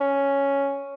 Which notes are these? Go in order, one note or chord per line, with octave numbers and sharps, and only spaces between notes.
C#4